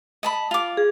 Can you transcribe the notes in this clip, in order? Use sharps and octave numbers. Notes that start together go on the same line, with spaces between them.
D#5 A5 B5
F4 D6
G#4